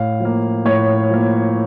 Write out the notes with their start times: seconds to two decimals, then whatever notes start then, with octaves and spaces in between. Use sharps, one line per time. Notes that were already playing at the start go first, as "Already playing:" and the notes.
Already playing: A2 F5
0.20 F3 A#3
0.65 A2 C#5
1.10 F3 A#3